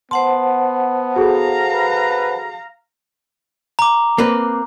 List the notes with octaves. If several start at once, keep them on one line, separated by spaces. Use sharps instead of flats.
B3 C5 F#5 A5 C6
F#4 G#4 A4 F5 A#5
B4
A#5 D6
A#3 C4 B4